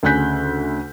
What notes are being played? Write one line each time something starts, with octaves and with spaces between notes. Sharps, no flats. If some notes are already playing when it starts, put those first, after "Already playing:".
D2 C#3 G#5 F#6 G6 B6